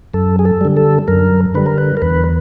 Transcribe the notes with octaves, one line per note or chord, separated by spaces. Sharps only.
F#2 A4
G#4
A4
D3 G3
A4
F#2 A#4
D3 G3 B4
A#4
B4
A#4
E2 B4